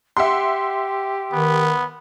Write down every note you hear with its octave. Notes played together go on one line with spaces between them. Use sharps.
G4 E5 F#5 C6
D#3 B3